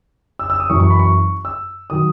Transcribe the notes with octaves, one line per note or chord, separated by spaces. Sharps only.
E6
E6
D#6
F#2 E3 C#6
C#6
B5
C#6
E6
D#3 F#3 D#6